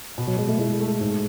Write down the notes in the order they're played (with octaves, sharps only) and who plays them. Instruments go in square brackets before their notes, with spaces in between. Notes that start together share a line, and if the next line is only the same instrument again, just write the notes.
[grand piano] B2
[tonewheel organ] F#3
[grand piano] B2 [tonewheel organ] G#3
[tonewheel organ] A3
[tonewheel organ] G#3 [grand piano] E4
[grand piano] A3
G#2